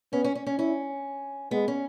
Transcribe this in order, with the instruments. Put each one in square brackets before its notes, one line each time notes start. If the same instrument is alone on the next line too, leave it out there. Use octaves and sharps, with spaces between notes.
[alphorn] B3 [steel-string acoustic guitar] C#4
[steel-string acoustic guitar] C#4
C#4
C#4
[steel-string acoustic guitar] C#4 [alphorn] E4
[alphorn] G#3 [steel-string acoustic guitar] B3
[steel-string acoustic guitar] C#4